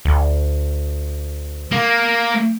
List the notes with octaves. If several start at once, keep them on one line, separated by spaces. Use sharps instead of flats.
D2
A#3